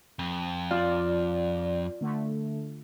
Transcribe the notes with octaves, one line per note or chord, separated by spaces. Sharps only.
F2
F4 D5
D3 A3